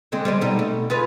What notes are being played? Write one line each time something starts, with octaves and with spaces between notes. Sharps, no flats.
D3 G#3 C4
G3 G#3 C4
B2 G3 D#4
A3
F4 G#4 B4